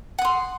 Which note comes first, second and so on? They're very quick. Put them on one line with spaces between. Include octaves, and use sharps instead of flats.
F#5 D#6 C6